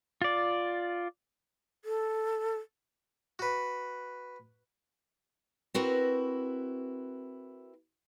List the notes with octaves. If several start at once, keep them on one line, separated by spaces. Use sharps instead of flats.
F4 D5
A4
F#4 B4
C4 E4 F#4 A#4 B4